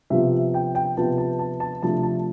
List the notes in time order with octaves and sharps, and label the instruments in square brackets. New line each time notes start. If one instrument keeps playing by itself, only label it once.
[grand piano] C3 F3 B3 F4 E5
G5
G5
C3 F3 B3 F4 A5
A5
A5
A5
C3 F3 A3 D4 A5
A5